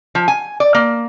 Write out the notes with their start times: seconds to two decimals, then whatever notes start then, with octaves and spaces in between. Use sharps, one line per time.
0.15 F3
0.28 G#5
0.60 D5
0.75 A#3